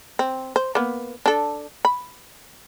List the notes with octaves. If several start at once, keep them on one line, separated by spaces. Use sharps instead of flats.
C4
C5
A#3 B3
D4 A4
B5